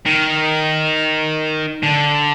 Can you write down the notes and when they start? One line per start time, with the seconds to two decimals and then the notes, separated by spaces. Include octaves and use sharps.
0.06 D#3
1.83 D3